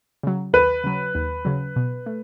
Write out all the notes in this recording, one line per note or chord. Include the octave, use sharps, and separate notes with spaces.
C#3 F#3
D#2 B4
C#3 F#3
D#2
C#3 F#3
B2
A3